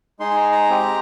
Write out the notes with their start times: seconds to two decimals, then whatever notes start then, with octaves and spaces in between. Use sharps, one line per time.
0.19 G#3 D#4 G#4 C6
0.30 G#5
0.37 A#5
0.52 A#5
0.69 G#3 C4 G4